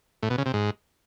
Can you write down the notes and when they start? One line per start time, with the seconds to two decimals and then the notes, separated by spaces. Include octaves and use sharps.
0.23 A2
0.30 B2
0.38 C#3
0.46 C3
0.54 G#2